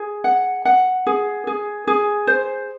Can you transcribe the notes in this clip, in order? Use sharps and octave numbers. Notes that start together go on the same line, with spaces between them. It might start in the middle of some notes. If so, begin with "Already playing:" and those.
Already playing: G#4
F#5
F#5
G#4
G#4
G#4
C5